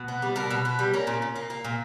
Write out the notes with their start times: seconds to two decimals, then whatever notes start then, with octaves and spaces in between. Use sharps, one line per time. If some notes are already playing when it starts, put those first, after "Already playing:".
Already playing: B2
0.08 B3
0.22 G3
0.36 B2 A#4
0.50 B2
0.65 B3
0.79 G3
0.93 A#3 C#4
1.07 A#2
1.22 A#2
1.36 A#3
1.50 A#3
1.64 A#2